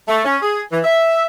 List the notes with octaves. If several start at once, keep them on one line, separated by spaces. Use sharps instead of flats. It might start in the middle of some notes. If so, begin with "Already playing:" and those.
A3
C#4
G#4
E3
E5